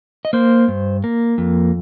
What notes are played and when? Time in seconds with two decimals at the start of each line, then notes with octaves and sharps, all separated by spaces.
0.25 D#5
0.33 A#3 C5
0.68 G2
1.04 A#3
1.38 F2